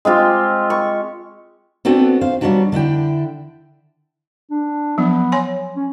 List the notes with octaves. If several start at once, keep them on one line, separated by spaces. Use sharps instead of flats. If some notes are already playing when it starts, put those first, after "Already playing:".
G#3 C4 F4 G4
C#6
B3 C4 D4 F#4 A4
C5 F5
F#3 G3 A3 B3 D4 F#4
D3 D4 E4 G5
D4
F3 F#3 B3
C#5 G#5 C6
C#4